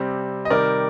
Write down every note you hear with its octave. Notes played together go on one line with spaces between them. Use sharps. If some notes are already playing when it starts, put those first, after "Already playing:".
Already playing: C3 G3 C4
D#5
C3 D#3 G3 A#4 D5